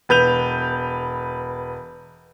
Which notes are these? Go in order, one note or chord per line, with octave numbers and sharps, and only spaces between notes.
E1 B4 G6 F7